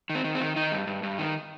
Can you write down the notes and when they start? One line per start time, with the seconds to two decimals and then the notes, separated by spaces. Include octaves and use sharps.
0.10 D#3
0.15 C4
0.24 D#3
0.35 C4
0.41 D#3
0.56 D#3 D#4
0.72 G2
0.87 G2
1.03 G2
1.19 D#3